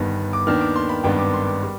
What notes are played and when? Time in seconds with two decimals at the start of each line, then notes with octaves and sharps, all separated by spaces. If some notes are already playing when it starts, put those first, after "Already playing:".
Already playing: G1 G2 D#3 B3
0.33 D6
0.47 D#2 D#3 B3 D4 F6
0.61 D6
0.76 C6
0.89 B5
1.04 G#1 G2 D#3 B3 D4 G5
1.19 D6
1.33 C6
1.47 D6
1.63 G3